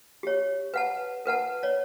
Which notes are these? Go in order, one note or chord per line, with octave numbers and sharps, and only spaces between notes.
G4 C#5
B4 F#5 A5
A#4 B4 F#5 A5
C#5 D5